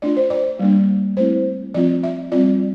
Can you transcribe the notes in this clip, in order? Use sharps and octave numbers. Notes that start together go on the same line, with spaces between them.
A3 D4 F4 D5
C5
D5
G3 A#3 D4
A3 C4 E4 C5
F3 C4 F4 D5
E5
G3 C4 F4 D5